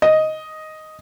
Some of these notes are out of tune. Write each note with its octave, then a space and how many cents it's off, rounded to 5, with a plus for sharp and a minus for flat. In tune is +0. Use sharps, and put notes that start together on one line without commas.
D#5 +5